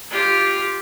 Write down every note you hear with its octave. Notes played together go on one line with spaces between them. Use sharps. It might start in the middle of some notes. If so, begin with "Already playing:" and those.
F4 G4